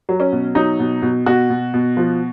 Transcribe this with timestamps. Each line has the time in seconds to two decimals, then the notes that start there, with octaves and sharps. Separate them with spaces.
0.09 F#3
0.20 C#4
0.32 B2
0.55 F#3 D#4
0.79 B2
1.02 B2
1.26 B2 F#4
1.50 B2
1.74 B2
1.97 F3